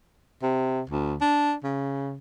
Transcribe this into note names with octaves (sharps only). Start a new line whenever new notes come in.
C3
D2
D4
C#3